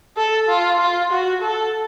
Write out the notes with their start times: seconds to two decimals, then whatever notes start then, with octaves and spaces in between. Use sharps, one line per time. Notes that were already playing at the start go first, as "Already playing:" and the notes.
0.17 A4
0.49 F4
0.79 F4
1.11 F#4
1.42 A4